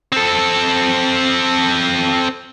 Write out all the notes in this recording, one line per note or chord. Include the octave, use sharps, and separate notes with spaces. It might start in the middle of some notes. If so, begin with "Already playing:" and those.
C4 A4